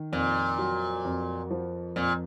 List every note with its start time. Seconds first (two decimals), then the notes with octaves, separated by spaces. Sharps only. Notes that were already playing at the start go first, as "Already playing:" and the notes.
Already playing: D#3
0.12 F2 A#2
0.59 F#3
1.04 F2
1.51 F3
1.96 F2 A#2